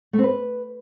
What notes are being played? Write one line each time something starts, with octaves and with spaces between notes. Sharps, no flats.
A3
C4
B4